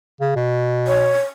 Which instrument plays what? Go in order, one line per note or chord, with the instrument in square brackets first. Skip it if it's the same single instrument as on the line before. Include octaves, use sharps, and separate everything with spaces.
[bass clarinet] C#3
B2
[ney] C#5